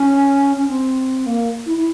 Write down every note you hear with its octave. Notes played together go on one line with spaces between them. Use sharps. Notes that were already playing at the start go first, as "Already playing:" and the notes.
Already playing: C#4
C#4
C4
A#3
E4
E4